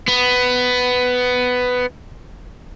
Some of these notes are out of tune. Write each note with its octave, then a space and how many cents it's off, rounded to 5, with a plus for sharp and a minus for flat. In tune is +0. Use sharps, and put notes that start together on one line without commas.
B3 +10